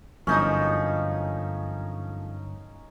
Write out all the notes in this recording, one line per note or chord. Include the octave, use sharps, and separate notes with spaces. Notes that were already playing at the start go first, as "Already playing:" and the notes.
G1 F#2 F3 A3 C#4 D#4 D#5